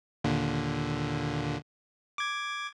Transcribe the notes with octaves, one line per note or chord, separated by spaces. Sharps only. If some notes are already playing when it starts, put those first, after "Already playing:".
D#2 A#2 D3
D6 G#6